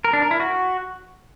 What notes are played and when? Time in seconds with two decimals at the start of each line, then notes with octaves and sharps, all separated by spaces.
0.05 A#4
0.13 D4
0.22 A#4
0.31 E4
0.40 F#4